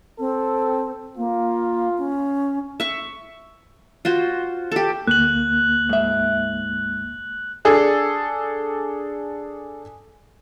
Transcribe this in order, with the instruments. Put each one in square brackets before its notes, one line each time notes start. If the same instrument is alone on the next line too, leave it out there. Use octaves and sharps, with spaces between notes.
[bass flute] C4 [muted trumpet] A4
[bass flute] A#3 [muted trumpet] F4
[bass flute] C#4
[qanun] E5 C#6
F4 F#4 C5
G4 A4
[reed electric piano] D2 A#3 [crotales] F#6 F#7
[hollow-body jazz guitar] G#2 E5
[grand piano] D4 G#4 A4